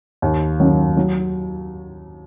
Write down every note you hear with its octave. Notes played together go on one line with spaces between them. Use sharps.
D#2
D#3 F#3 C#4
F#3